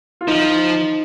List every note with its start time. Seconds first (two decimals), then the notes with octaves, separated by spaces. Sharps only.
0.21 F4
0.27 F3 D#4